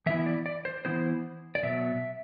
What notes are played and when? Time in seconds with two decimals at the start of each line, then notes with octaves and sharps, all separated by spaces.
0.06 E3 B3 E4 E5
0.26 D5
0.46 D5
0.65 C5
0.85 E3 B3 E4 C5
1.55 D5
1.63 B2 F#3 B3 E5